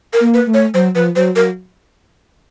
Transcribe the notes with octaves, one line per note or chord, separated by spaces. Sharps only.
A#4
A#3
B4
A3
C#5
F#3 C5
F3 B4
F#3 C5
F#3 A#4